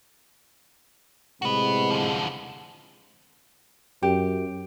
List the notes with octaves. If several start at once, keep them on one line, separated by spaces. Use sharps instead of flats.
A2 C3 G#3 F#4 B4
D3 F3
F#2 G4